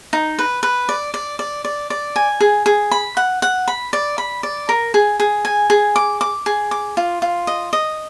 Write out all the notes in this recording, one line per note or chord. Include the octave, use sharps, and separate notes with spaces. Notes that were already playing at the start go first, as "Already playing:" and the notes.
D#4
B4
B4
D5
D5
D5
D5
D5
G#5
G#4
G#4
B5
F#5
F#5
B5
D5
B5
D5
A#4
G#4
G#4
G#5
G#4
D6
D6
G#4
D6
F4
F4
D#5
D#5